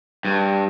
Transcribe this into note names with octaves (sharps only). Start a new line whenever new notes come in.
G2